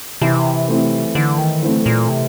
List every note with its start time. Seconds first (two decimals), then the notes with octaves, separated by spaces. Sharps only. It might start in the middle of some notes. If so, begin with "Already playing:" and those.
0.21 C3 E3
0.69 A3 C4 E4
1.15 D3 E3
1.38 D#3
1.62 D3 A3 C4 E4
1.86 A#2
2.09 C3